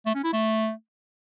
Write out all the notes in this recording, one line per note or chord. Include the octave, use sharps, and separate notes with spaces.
A3
C#4
E4
A3